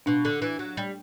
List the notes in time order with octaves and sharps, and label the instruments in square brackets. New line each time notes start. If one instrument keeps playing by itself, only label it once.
[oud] B2 [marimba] D4
[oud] D3
E3
F#3
G3